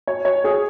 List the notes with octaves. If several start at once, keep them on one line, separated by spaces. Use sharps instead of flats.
C#5
C#5
G#4